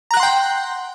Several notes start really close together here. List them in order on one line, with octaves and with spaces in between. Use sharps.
A#5 F#6 F#5 C6 G5